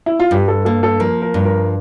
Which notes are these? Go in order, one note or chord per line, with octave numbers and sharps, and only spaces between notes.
E4
F4
G2 G4
A4
A#3 A4
A4
F3 A#4
A#4
G2
A#4